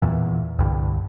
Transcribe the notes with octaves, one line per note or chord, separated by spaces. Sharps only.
E2 A#2 E3
C2 G2 D3